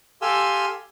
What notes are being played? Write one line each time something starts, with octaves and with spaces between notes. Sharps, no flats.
G4 A4 F5 G#5 C6 E6